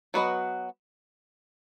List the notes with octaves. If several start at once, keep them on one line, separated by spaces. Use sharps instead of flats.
F#3 B3 F#4 B4 D#5